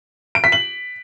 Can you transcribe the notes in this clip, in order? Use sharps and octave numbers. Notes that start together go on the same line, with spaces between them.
D7
B6
F#7